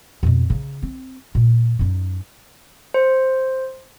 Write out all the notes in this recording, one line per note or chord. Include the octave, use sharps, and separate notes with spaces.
F2 B2
C#3 D#4
C4
A#2
F#2 D#4
C5